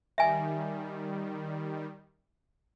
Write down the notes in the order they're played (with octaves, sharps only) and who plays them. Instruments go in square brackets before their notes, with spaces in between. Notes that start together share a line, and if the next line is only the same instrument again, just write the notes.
[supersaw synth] D#3 G3 [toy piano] E5 G#5